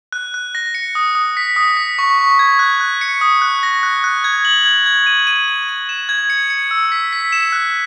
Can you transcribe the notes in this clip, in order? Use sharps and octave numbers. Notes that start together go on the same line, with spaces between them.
F#6
F#6
A#6
C#7
D#6
D#6
B6
D#6
B6
C#6
C#6
G#6
F#6
F#6
C#7
D#6
F#6
A#6
F#6
F#6
G#6
F#7
G#6
G#6
D#7
D#7
D#7
D#7
E7
G#6
C#7
C#7
E6
B6
B6
E7
F#6